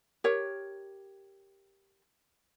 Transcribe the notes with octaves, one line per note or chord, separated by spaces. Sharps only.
G4 A#4 C#5